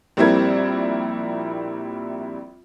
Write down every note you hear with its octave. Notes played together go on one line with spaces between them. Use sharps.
A#1 G3 C4 E4 A#4 G#6